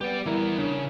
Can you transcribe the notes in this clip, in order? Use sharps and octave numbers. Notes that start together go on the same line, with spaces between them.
G3 B3 G4 D5
E3 B3 E4 A#4
C#3 D4